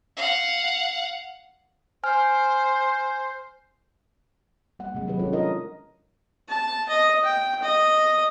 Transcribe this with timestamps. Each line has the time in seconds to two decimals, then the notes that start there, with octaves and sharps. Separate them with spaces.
0.16 F5 F#5
2.04 C5 G#5 F6
4.79 G3 A#3 F#5
4.95 C3 F#3 G#3
5.07 D#3 F#3 G4 B4
5.19 C#4 F4 F#4 A4 C#5
5.32 D4 E4 A#4 D#5
6.49 A5
6.89 D#5
7.24 G5
7.62 D#5